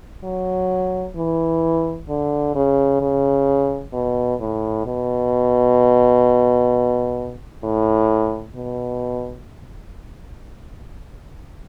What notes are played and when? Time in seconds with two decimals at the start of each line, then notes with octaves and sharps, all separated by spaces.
0.24 F#3
1.16 E3
2.09 D3
2.55 C#3
3.01 C#3
3.93 B2
4.40 A2
4.86 B2
7.64 A2
8.55 B2